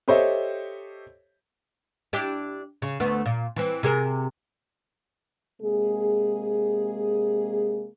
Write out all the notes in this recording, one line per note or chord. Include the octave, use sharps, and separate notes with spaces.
G4 A4 C5 C#5 D#5 E5
D4 E4 G4
C#3
D2 A3 B3
A#2
E3 C4
C3 G#4 A#4
C3 G#3 A#3 G#4